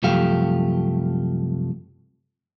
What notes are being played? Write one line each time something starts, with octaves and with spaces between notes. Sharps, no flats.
C2 F#2 F3 A3 G4 F5